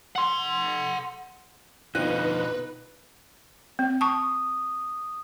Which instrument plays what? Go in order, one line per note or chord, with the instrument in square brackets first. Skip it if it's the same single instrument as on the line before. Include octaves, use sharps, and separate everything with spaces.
[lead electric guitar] F#5 C6
[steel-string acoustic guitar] F2 F3 [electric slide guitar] B2 D3 [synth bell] D#4 F#6 [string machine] B4
[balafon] C4
[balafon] A5 C#6 [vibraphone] D#6